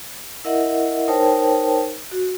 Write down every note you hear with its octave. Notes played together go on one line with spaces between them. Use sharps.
E4 A#4 D#5 E5 F#5
D#4 A#4 C5 C#5 G5 A5
F#4